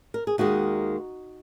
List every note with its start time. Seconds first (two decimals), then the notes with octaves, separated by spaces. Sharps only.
0.14 A#4
0.27 G#4
0.38 D#2 D#3 G#3 D#4 F#4